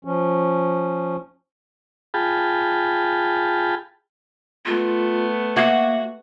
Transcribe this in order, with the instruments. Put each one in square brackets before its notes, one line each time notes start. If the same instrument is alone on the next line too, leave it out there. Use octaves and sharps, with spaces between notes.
[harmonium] F3 C#4
[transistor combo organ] F4 G#4 G5 A5 B5
[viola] A3 B3 [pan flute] F4
[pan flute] A#3 [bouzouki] F#4 [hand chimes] E5 F#5